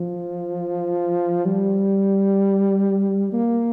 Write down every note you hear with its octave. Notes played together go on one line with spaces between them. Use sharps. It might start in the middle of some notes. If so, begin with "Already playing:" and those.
Already playing: F3
G3
A#3